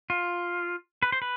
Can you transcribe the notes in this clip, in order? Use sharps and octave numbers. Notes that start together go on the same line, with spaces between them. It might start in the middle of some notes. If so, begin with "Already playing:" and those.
F4
B4
C5
B4